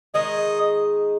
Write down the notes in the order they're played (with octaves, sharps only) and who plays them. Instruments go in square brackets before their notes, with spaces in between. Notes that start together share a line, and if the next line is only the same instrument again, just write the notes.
[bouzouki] D#3 G#3 D#4 G#4 [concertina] D#5